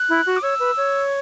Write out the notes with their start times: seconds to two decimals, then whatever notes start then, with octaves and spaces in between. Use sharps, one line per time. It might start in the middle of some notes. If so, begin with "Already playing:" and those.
Already playing: F#6
0.09 E4
0.26 F#4
0.37 D6
0.43 C#5 E6
0.60 B4
0.77 C#5